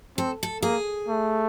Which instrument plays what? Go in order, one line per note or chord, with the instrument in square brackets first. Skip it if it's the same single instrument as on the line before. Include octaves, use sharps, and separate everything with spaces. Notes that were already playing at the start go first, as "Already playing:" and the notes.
[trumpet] C4 [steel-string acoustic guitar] A4
[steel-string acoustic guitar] A4
[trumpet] A#3 [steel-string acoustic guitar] G#4
[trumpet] A3